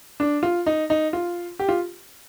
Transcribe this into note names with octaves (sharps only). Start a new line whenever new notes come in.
D4
F4
D#4
D#4
F4
G4
F4